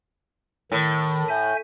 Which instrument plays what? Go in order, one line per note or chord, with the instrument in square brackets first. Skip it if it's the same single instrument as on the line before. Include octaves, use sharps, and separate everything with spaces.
[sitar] A2 [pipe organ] D#3
[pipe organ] E5 G#5 G6